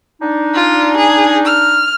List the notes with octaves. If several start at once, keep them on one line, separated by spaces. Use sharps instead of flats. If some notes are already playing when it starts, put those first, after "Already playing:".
D4 D#4
F4
G#4
F6